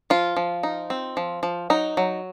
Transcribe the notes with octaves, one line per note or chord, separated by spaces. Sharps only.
F3 F4
F3
D#4
C4
F3
F3
F#3 D#4
F#3